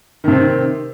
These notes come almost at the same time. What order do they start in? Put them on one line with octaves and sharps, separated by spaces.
D#3 C3 C4